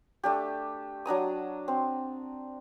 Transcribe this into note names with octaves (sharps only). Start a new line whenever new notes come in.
A3 D4 G4
F#3 D4 A#5 D#6
C4